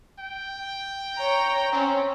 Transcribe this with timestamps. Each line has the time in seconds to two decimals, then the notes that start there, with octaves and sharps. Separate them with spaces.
0.19 G5
1.16 C#5 A#5
1.72 C4 C#4